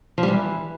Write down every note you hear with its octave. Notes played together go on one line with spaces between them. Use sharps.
F3
G3
E3